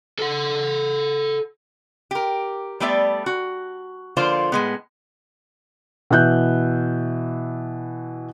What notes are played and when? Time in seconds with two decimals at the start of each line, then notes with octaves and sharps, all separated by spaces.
0.19 A4 F#5
2.11 G4 A#4
2.80 G3 A3 B3 D5 E5
3.26 F#4
4.17 D3 F3 A#3 F4 C5 D5
4.52 A2 G#3 B3
6.10 B2 E3 E5 F#6 G6